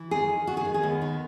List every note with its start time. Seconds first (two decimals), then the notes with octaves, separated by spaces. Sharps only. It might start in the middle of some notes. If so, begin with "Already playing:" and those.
Already playing: E3
0.11 D#3 G#4
0.29 D#3
0.47 D#3 F#4
0.57 G#4
0.65 D#3
0.74 G#4
0.83 D#2 B3
1.01 D#3